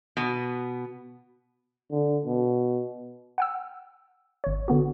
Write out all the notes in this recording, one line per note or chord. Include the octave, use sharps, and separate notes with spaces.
B2 B3
D3
B2
F#5 G5 E6
G#1 C#5
D3 B3 F#4